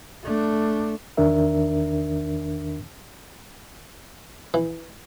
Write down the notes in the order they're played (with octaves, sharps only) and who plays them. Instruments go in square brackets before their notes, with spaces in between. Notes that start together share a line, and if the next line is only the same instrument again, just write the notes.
[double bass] A3 D4
[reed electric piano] E2 D#3 D4 A#4 E5
[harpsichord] E3